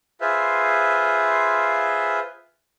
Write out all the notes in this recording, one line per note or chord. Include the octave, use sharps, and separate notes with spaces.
F4 G#4 B4 C5 E5 F5